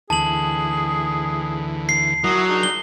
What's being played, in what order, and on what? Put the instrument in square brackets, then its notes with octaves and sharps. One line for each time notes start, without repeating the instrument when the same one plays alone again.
[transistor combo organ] D2 E3 [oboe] G#4 [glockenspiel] A5 F#7
[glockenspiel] C7
[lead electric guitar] F#3 [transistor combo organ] E4 A#4 [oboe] D#6
[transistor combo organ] D4 G#4 A#4 [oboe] D#4
[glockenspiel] G7